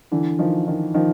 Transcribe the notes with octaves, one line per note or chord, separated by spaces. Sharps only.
D3 E3
D#3 F3
D#3
D#3 F3